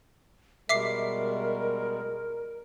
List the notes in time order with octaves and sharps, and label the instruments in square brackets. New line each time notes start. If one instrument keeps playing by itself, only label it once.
[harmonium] B2 G3 G#3 [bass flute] A#4 [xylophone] E5 D6 C7